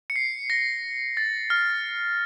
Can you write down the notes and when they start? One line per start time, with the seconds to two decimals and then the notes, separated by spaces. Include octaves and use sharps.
0.10 C#7
0.16 C7
0.50 A#6
1.17 A6
1.50 F6